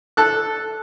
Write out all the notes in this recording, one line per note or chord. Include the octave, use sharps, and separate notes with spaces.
A4 F#6